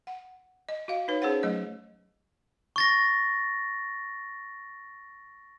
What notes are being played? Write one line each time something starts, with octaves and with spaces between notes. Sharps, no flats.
F#5
D#5
F#4 D#5 F5
D#4 B4 C#5
C#4 G#4 C5 C#5 F#5
F#3 A3 D#5
C#6 A6 A#6